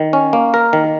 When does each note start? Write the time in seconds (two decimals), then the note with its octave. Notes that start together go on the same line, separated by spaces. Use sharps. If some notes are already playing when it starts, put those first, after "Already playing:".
Already playing: D#3
0.13 C#4
0.33 A#3
0.54 A#4
0.73 D#3